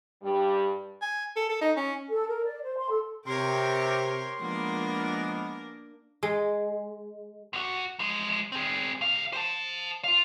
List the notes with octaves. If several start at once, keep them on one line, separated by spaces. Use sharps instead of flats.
G2 G3
G#5
A4
A4
D#4
C#4
A4
A#4
D5
C5
C6
A4
C3 G4 A#4 C#5 C6
F3 G#3 A#3 B3 D4 A#4
G#3
F#2 F#4
F3 G#3
C4 G#4
C2 F5
C5 A5
F4 F5